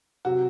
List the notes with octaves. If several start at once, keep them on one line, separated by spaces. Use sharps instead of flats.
C3 F#3 F#4